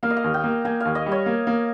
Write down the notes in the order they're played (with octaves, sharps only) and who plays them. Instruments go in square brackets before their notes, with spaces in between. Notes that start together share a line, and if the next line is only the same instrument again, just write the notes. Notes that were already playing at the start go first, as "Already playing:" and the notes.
[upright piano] A#3 [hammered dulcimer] F5
[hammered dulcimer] D#5
F5
[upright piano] D#2
[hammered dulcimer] G5
[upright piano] A#3
[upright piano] A#3 [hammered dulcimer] G#5
[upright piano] D#2 [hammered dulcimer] F5
[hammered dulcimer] D#5
[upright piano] G3
[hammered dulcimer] C#5
[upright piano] A#3
A#3